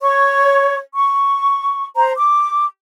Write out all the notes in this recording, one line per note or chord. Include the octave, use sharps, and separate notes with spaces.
C#5 C#6
C#6
C5 A#5
D6